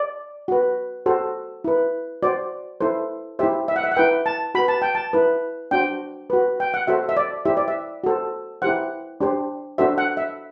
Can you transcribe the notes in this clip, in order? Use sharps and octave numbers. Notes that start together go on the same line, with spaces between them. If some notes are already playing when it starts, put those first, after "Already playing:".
Already playing: D5
F#4 B4
F#4 A4 C5
E4 B4
F#4 C5 D5
E4 A4 C5
E4 G4 C5 E5
E5
F#5
E5
F#5
E4 B4 G5
A5
F#4 B4 B5
A5
G5
A5
E4 B4
D4 F#4 C5 G5
F#4 B4
G5
F#5
F#4 A4 C5 E5
E5
D5
E4 G4 C5 E5
D5
E5
F#4 A4 C5
E4 G4 C5 F#5
D4 G4 C5
D4 F#4 A4 C5 E5
F#5
E5